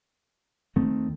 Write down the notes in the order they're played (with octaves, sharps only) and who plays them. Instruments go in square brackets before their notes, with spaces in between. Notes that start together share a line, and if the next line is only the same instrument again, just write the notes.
[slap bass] D#2 D#3 A3 C4